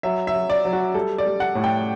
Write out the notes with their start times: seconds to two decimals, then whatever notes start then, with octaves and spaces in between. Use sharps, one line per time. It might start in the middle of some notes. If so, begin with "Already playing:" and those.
0.03 F#3 E5
0.27 E5
0.34 F#3
0.50 D5
0.65 F#3
0.73 F#4
0.94 G3 A4
1.18 D5
1.26 G3
1.40 F#5
1.55 A2
1.64 G5